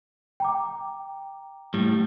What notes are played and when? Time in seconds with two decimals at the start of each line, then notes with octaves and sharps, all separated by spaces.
0.40 G5 A#5 D6
1.74 A2 G3